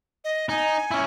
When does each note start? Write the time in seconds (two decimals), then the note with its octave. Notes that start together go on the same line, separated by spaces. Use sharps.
0.24 D#5
0.49 D#4 G#5
0.91 C#4 E4